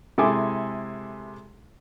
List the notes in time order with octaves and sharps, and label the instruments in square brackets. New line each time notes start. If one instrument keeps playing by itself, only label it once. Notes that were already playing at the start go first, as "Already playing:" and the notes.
[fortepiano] C3 G#3 E4 A4 G#5 D6